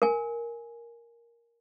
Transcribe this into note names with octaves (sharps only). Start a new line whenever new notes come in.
A#4 G#5